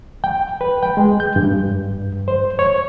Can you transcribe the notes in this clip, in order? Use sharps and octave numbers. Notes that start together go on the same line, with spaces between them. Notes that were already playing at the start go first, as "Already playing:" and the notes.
G5
B4
G5
G#3
G6
G2
C5
C#5